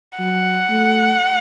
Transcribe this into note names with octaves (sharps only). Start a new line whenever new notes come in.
F#3 F#5
A3